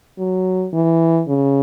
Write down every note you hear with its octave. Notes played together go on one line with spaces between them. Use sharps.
F#3
E3
C#3